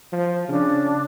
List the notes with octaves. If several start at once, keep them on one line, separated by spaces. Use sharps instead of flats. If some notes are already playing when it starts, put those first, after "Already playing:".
F3
C#3 D4